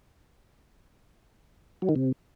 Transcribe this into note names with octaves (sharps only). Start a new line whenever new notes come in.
F#3
D#3
C3